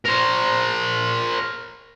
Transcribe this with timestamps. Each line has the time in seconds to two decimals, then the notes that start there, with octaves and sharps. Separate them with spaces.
0.05 A#4 C5